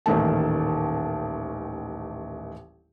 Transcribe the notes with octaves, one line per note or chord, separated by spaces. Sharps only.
D#1 A1 D#3 A3 A5